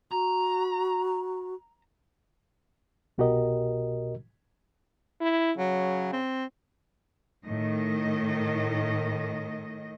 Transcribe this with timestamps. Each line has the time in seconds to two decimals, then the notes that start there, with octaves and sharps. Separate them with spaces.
0.12 F#4 A#5
3.18 C2 B2 F#4 G4 A#4 D#5
5.21 E4
5.57 C#3 F#3
6.13 C4
7.45 A2 D#3 D#5